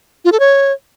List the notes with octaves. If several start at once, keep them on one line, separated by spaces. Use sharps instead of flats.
F4
A4
C#5